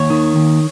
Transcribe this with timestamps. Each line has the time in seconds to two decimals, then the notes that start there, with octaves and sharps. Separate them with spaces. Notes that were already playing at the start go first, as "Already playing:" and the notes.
Already playing: D#2 C#5
0.10 D#3
0.36 D#2